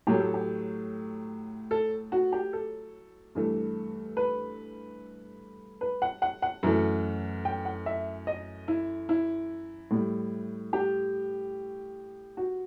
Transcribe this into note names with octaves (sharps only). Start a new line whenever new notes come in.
A2 F#3 A3 G4
A4
G4
A4
F#4
G4
A4
G2 E3 A3
B4
B4
F#5
F#5
F#5
F#2 E3 A3
G5
F#5
E5
D#5
E4
E4
A2 G3
G4
F#4